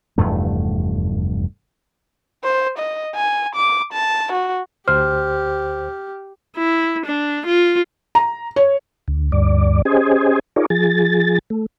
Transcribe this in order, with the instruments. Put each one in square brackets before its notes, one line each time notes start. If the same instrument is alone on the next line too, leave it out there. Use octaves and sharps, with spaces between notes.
[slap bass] F1 E2 G2 A3
[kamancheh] C5
D#5
G#5
D6
A5
F#4
[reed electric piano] D2 C5 [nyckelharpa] G4 [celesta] F6
[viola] E4
D4
F4
[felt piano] A#5
C#5
[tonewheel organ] D2
D2 G2 D5
C#4 G4 G#4 C5 D#5 G#5
D#4 F4 G#4 A#4 C#5 D5
F3 G#4 A6
A3